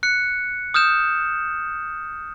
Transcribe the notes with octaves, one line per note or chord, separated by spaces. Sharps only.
F#6 C#7
D#6 F6 G6 E7